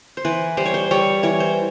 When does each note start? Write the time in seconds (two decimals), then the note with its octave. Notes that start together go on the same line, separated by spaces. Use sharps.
0.17 C5
0.25 E3 B4
0.57 G3 C5
0.66 C#5
0.74 C5
0.91 G3 C#5
1.23 E3 C#5
1.40 C5